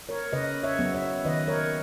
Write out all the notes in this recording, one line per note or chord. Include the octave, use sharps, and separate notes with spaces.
A#4 C#5
C#3 B4 D#5
C#5 E5
F#3 B3
C#5 E5
D#3 B4 D#5
A#4 C#5